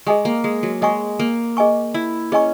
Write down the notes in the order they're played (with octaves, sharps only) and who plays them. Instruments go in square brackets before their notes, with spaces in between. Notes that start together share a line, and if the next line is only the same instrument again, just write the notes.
[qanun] G#3 [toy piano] G#4 D#5 G#5 C#6
[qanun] A#3
G#3
F#3
[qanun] G#3 [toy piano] G#4 D#5 G#5 C#6
[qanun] A#3
[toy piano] G#4 D#5 G#5 C#6
[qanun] E4
[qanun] C#4 [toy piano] G#4 D#5 G#5 C#6